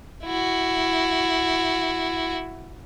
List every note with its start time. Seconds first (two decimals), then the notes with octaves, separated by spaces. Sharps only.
0.24 E4 F#4